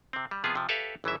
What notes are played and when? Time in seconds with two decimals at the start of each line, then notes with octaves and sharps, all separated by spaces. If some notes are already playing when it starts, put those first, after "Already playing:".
0.13 C3 C4
0.31 G3
0.44 C3 F3 B3 F4 G#4
0.56 C3 F3
0.69 G4 A4 B4 C#5 E5 F5
1.04 G#1 E3 F#3 E5